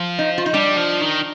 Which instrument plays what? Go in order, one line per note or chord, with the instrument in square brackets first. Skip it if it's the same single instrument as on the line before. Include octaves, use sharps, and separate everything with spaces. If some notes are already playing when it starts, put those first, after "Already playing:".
Already playing: [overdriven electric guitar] F3
[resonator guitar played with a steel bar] D#4
F4
D#4
[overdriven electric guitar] G3 [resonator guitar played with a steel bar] D4
[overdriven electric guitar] F3
D#3